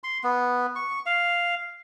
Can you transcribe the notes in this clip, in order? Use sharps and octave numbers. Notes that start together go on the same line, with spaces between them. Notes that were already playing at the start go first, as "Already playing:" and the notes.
C6
B3
C#6
F5